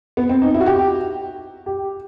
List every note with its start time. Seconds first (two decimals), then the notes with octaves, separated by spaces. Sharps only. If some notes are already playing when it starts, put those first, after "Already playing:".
0.17 B3
0.29 C4
0.42 D#4
0.54 E4
0.60 F#4
0.66 G4
1.66 G4